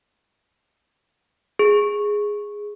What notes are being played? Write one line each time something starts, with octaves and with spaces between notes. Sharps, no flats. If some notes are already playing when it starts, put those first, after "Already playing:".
G#4